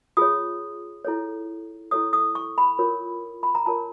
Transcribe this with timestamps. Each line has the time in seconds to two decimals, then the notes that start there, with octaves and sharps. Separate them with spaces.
0.17 F4 G#4 C#5 D#6
1.05 E4 A4 C#5
1.91 E4 A4 C#5 D#6
2.13 D#6
2.35 C#6
2.58 B5
2.79 F4 A#4 C#5
3.43 B5
3.55 A#5
3.66 F4 A#4 C#5 A5